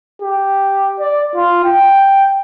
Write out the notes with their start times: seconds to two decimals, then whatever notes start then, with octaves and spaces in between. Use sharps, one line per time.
0.22 G4
1.00 D5
1.35 F4
1.64 G5